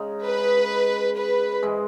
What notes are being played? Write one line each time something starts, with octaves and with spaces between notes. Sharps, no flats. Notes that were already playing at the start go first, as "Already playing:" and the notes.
Already playing: C#3 G#3 D#4
B4
B4
G#2 E3 G#3